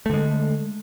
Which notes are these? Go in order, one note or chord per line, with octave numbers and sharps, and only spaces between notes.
D3 G#3 A3